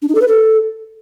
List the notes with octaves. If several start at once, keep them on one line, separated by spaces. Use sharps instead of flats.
D4
D#4
A4
B4
A4